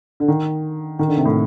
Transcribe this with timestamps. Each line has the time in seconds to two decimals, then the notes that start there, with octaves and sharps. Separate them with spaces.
0.20 D3
0.28 D#3
0.99 D#3
1.08 D3
1.17 C3
1.25 A2